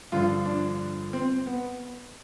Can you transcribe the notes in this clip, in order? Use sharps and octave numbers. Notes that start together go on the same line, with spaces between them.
G2 D3 F3 F4
D4
C4
B3